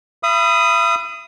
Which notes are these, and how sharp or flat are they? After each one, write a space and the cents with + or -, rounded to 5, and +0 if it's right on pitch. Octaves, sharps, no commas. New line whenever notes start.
E5 +45 B5 +0 D#6 +0